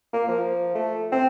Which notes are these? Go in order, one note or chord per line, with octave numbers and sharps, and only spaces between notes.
A#3
F3
A3
C4